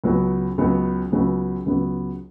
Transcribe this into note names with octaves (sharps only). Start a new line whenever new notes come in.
C#2 C#3 F#3 B3
C#2 C#3 F#3 B3
C#2 C#3 F#3 B3
C#2 C#3 F#3 B3